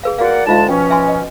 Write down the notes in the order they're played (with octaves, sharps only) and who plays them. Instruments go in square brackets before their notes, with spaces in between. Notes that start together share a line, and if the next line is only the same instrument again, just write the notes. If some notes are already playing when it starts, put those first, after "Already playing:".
[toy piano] G#4 B4 F5
[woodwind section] A#3 D5 F#5 [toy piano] F#4 G#4 F5
[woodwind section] D2 G#3 A5 [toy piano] D#4 F4 F5
[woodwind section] B2 F3 C#4 [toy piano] G5
[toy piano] E5 G#5 C6
D#5